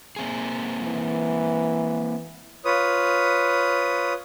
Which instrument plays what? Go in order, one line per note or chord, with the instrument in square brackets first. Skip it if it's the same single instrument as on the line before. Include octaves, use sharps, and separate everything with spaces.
[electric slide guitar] A#3 C4 G#4
[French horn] E3
[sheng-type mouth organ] F4 B4 C#5 D#6